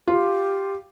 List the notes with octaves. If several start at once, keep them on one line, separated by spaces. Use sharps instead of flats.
F4 G4